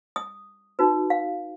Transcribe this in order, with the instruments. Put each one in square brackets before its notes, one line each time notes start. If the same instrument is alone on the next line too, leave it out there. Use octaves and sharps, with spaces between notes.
[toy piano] D#6
D#4 F#4 B4
F5